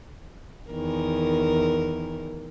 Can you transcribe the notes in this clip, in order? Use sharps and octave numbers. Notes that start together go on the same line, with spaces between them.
E2 D#3 A#4